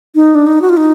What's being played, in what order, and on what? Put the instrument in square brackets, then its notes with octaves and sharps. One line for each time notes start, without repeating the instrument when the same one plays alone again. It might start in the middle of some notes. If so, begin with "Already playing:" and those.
[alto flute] D#4
D4
D#4
F#4
F4
D#4